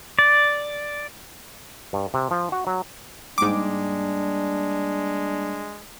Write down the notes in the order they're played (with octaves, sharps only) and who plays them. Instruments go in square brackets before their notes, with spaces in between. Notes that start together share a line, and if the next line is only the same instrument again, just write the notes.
[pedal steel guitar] D5
[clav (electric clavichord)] G2
C3
F3
F#4
F#3
[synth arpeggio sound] G#2 D6 [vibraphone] G3 A#3 [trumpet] G#3 [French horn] D4